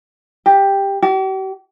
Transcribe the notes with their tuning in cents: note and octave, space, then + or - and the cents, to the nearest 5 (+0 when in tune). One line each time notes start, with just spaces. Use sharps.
G4 +10
G4 -45